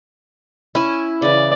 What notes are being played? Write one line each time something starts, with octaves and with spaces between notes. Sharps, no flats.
C#4 E4 G#5
C#3 E3 D5